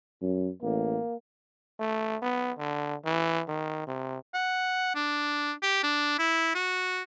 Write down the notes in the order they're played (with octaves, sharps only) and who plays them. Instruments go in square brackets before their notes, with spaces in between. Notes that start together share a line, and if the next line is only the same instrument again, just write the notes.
[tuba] F#2
[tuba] A1 [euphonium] A#3
[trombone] A3
B3
D3
E3
D#3
C3
[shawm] F#5
D4
G4
D4
E4
F#4